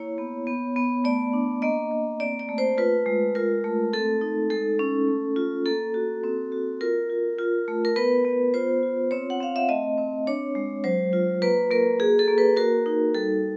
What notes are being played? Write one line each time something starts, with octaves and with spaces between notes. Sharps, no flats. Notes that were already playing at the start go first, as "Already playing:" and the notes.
Already playing: A#3 E4 C#5
B3
B3
B3
A3 D5
D4
A#3 D#5
A#3
C4 D5
D5
A3
C5
F4 B4
G#3
F4 A#4
A3
C4 A4
D#4
G#3 A4
C#4
A3
F4
A#3 A4
F#4
C4
F#4
F4 A#4
F4
F4
A3
A#4
B3 B4
B3
F4 C5
F4
C4 C#5
F#5
C4 F5
E5
A3 D#5
C4
D4 C#5
G#3
F#3 C5
F4
A#3 B4
A#3 A#4
F#4 G#4
A4
A#3
B4
F#4 A#4
D#4
G3 A4